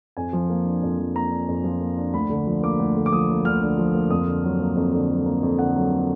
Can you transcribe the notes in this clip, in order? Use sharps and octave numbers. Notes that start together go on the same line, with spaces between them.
F2 G#5
F3
A#3
D4
F2
F3
A#3 A#5
D4
F2
F3
A#3
D4
D2 B5
D3
F3
A#3 D6
D2
D3
D6
F3 D#6
A#3
D2 F6
D3
F3
A#3
F2 D#6
D3
F#3
A#3
F2
D3
F#3
A#3
F2
D3 F#5
F#3
A#3